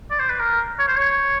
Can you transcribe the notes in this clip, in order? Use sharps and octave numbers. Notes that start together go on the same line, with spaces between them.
D5
C5
B4
A#4
C#5
C5
C#5